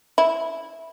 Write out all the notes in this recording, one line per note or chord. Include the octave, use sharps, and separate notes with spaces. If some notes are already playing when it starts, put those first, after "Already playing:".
E4